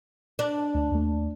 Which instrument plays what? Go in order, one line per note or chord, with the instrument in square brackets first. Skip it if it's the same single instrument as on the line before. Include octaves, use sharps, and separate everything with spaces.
[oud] D4
[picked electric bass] D2
D#2 A3